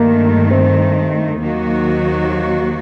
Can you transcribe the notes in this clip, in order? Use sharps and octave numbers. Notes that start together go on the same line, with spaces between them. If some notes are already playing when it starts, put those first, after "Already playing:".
Already playing: G2 D#3 A3 A#3
C4
D#2 D#3 F#3 A#3 F#4